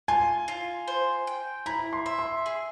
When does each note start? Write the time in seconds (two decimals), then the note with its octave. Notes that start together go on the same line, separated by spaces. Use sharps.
0.08 F4 G#5
0.48 F4
0.88 C5
1.27 G5
1.66 E4 A#5
1.93 C6
2.06 E5
2.19 C6
2.46 G#4